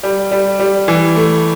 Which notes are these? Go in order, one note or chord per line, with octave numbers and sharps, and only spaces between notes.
G3
G3
G3
E3
A3